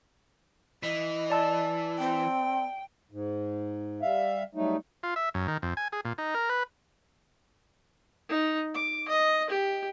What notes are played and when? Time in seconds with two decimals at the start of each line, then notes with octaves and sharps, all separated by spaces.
0.83 E3 D#5
1.30 D5 A5 E6
1.99 C4 G5
3.12 G#2
4.02 G3 E5 F5
4.55 F#3 G3 A3 D#4
5.03 F4
5.16 E5
5.34 F#2
5.48 D#3
5.62 F2
5.77 G#5
5.92 G#4
6.05 A#2
6.18 D#4
6.35 A#4
6.50 B4
8.29 D#4
8.74 D6
9.08 D#5
9.50 G4